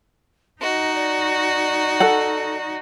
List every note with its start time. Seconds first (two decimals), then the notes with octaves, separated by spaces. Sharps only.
0.62 D#4 F#4 D#5
0.95 D5
2.00 A4 F#5